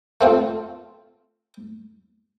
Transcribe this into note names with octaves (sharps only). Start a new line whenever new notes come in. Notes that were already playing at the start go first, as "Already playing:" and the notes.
A3 C4 F4